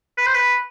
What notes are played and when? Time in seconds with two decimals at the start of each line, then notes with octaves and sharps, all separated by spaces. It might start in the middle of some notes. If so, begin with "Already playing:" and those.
0.18 B4
0.26 C5
0.34 B4